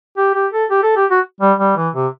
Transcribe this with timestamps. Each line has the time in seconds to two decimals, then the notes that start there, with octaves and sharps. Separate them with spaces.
0.17 G4
0.34 G4
0.53 A4
0.70 G4
0.83 A4
0.96 G4
1.11 F#4
1.41 G3
1.60 G3
1.77 E3
1.95 C3